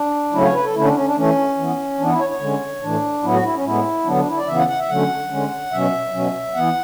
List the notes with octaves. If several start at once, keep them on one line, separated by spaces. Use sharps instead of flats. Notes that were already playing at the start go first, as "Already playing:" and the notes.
Already playing: D4
C#3 F#3 A3 C#4 E4
C#5
B4
A4
D3 A3 C#4 E4
D4
C#4
D4
E3 A3 C#4
E3 B3
E3 B3 D4
E4
C#5
C#5
D3 G#3 C#4
A2 E3 A3 D4
A2 F#3 B3 E4
F#4
E4
C#4
A2 G#3 B3 E4
D3 F#3 B3 D4
D4
E4
D5
C#3 E3 B3 E5
F#5
F#5
E5
D3 F#3 A3 C#4 F#5
D3 G#3 C#4
B2 F#3 C#4 E5
B2 F#3 C#4
E3 B3 F#5